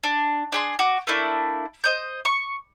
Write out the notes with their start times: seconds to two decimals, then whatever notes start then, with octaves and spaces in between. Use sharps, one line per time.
0.03 D4
0.52 D4 G#4 C6
0.79 F#4 D6
1.07 A3 A#3 D4 E4
1.84 C5 D#5 G6
2.25 C#6